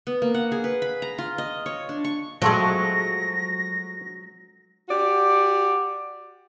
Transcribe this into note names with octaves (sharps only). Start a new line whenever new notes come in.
B3
A#3
F#5
G#4
B4
B5
A#5
F4
D#5
C#5
D4
C#6
F3 F#3 G#3 A3 C4 A#6
F#4 G4 D5